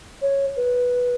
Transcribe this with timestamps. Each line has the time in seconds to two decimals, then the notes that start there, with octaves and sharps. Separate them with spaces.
0.22 C#5
0.57 B4